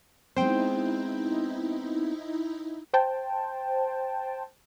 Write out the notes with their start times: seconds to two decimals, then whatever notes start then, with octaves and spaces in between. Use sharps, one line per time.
0.36 G#3 B3 C4 D#4 E4 C5 G5
2.94 C5 G5 A5